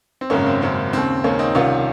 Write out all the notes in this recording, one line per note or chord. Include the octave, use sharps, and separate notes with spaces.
C4
G#1 F#2 C#3 A#3 C#4
C4
G#1 F#2 C#3 C4
D#2 C#3 C4
D#2 C#3 A#3 C#4
C4 D#4
C2 C3 D#3 C#4 F4